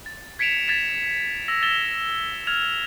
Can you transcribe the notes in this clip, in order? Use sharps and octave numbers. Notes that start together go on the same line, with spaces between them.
A6
G#6 B6 C#7 D7 E7 F7
G#6 A6 B6 E7
E6 A#6 F7
E6 A6 E7 G7
F6 G#6 F7